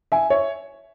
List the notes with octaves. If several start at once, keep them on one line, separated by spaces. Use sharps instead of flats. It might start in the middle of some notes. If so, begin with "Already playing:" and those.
E5 G#5
C#5 E5